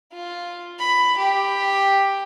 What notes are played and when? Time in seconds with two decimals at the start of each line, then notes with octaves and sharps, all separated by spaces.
0.13 F4
0.79 B5
1.17 G4